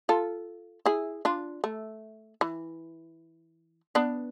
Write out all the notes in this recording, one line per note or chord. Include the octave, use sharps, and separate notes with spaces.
F4 A4
E4 G#4
D4 F4
A3
E3
B3 D4